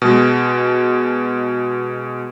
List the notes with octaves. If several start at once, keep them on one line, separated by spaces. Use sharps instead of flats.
B2 G#3